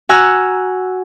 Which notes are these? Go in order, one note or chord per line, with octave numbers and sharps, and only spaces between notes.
F#4 F#5 G#5 A#5 E6 F6